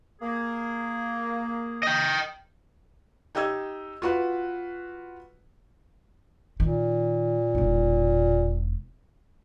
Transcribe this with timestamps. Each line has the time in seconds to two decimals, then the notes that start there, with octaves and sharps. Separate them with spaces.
0.21 A#3 G#4
1.83 D#5 G5
3.35 D#4 G4 D#5 E6 G#6
4.02 F4 F#4 B4
6.60 A#2 D#3
7.55 E1 D#4